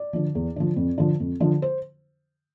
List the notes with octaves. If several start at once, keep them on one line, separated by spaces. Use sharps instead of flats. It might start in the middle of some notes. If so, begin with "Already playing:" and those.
Already playing: D5
D3 F3
E2
D3 F3
F2
D3 F3
F2
D3 F3
C5